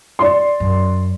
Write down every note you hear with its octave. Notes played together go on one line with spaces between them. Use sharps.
D5 C6
F#2